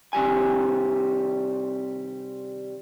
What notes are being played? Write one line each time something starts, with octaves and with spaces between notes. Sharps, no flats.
C3 D#3 G3 G#5